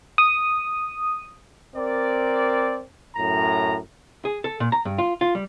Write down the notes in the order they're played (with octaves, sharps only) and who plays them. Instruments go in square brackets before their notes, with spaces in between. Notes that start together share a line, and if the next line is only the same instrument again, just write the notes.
[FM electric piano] D#6
[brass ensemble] C4 A#4 D5
F#2 A2 A#5
[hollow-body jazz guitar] G#4
A4
A#2
A#5
G2
F4
F4
G3